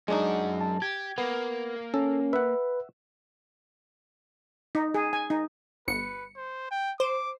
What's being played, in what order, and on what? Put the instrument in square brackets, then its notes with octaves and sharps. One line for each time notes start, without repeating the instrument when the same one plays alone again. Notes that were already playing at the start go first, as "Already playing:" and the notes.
[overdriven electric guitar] F#2 F#4 [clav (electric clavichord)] G#3 D4 D#4
[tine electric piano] A5
[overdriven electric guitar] G4 [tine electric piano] G#6
[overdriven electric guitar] A#3 [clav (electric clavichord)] B3
[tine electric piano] C#4 [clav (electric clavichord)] A4
[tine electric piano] B4 [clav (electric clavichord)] E5 F#5
[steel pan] D#4
G#4
G#5
D#4
[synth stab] G1 C#7 [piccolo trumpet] B4
[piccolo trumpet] C5
G5
[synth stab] C5 [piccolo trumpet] D6